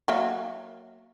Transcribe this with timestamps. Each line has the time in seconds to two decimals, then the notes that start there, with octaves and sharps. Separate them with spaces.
0.08 F#3 A#3 E5